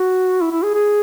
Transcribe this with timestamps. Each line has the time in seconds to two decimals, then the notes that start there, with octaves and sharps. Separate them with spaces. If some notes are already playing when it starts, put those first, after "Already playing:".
Already playing: F#4
0.41 E4
0.52 E4
0.63 G#4
0.74 G#4